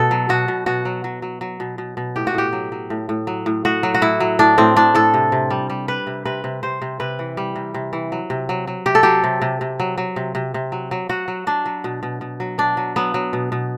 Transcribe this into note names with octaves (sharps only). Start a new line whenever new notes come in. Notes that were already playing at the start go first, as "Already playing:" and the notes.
Already playing: B2 A4
F#3
B2 F#4
B2
B2 F#4
F#3
F#3
F#3
F#3
B2
B2
B2
A2 G4
F#4
A2 G4
F#3
F#3
A2
A2
F#3
A2
A2 F#4
F#3
F#4
A2 E4
F#3
A2 D4
A2 C4
A2 D4
A2 A4
C3
C3
G3
G3
G3 B4
C3
C3 B4
C3
C3 C5
C3
C3 B4
E3
G3
C3
C3
E3
F#3
C3
F#3
F#3
C3 G4
A4
F#3 G4
C3
C3
C3
F#3
F#3
C3
C3
C3
F#3
F#3
F#3 F#4
F#3
F#3 D4
F#3
B2
B2
B2
F#3
B2 D4
F#3
F#3 B3
F#3
B2
B2